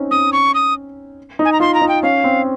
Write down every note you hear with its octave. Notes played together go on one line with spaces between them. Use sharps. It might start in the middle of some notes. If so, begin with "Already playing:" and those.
Already playing: C4 C#4 D#4
C#4 D#6
C#6
D#6
D#4
G#5
A#5
F4 C6
A#5
D#4
G5
C#4 F5
C4